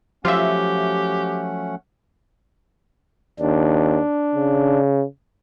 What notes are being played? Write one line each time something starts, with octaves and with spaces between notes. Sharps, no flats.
F3 F#3 A3 C#4 F4 G4 E5 F#5
D#2 D4
C#3